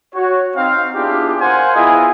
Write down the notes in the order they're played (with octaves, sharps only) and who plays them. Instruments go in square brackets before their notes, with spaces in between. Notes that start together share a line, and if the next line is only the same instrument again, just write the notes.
[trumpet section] F#4 C#5
C4 D#4 F5
B3 D4 E4 F4 G4 G#4
A#4 C5 F5 F#5 G#5 C6
B3 E4 F4 G#4 D#5 G#5